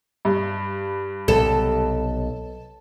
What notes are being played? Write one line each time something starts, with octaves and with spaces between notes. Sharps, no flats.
G2
B1 C3 A4